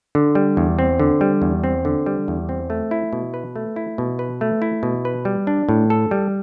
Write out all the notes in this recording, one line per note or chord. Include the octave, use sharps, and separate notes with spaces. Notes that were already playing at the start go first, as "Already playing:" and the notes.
D3
G3
E2
C4
D3
G3
E2
C4
D3
G3
E2
C4
A3
E4
B2
B4
A3
E4
B2
B4
A3
E4
B2
B4
G3
D4
A2
A4
G3